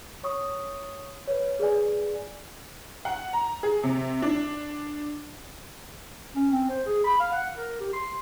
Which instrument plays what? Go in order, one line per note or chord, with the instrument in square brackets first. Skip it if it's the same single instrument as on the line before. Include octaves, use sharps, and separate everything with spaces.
[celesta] C#5 C#6 D#6
B4 C#5
G#4 B4 D5 G#5
[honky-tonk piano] F#5
A#5
G#4
C3
D4
[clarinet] C#4
C4
C5
G#4
B5
F5
F#5
A#4
G4
C6